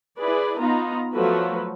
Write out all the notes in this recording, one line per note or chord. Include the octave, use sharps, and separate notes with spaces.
E4 G#4 B4 D5
B3 D#4 F4 A#5
F3 F#3 A3 F#4 B4